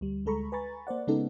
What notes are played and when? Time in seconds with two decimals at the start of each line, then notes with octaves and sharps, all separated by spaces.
0.01 D2 G3
0.26 D2 G#3 A4 A#5 B5 C#6
0.52 B4 G#5 A#5 B5 C#6 A6
0.87 A#3 C5 D5 F#5
1.07 C#3 G#3 B3 C#4 D#4 A4